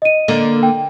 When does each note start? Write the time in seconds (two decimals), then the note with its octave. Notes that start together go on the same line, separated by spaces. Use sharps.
0.02 D#5 D#7
0.28 D3 A#3 A4
0.63 G5